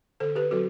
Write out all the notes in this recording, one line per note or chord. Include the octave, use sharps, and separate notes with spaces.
D3 A4 C5
G4 B4
F#3 C4 F#4 A4